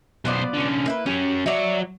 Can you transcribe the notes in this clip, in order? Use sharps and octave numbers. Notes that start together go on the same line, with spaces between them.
B1 B3 F4 C5 D5
D3 C#4
A#3 E4 B4
F#3 C#4 G4
F#3 C#5 D5 E5